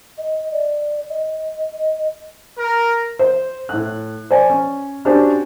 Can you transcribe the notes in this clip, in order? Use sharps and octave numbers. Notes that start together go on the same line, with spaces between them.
D#5
D5
D#5
A#4
C5
A2 F#6
C5 D5 G#5
C#4
C#4 D4 F#4 G4 C5